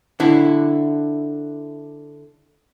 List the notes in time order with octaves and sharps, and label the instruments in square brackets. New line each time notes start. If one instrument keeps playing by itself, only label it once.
[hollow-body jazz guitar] D3 E4